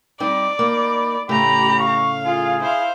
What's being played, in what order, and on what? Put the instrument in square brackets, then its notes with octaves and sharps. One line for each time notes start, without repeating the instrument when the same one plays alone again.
[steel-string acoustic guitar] G3 C4 D#4 [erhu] D5
[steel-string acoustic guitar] A#3 D#4 [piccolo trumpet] B5
[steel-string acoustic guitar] A2 C#3 A3 [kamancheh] G4 A#5 [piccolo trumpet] B5
[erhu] F5 [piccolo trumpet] C#6
[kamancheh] F4 [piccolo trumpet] G#4
[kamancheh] E4 F5 [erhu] C5